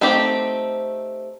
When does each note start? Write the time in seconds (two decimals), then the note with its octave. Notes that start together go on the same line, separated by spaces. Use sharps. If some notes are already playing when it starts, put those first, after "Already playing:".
0.01 A3 C4 D#4 G4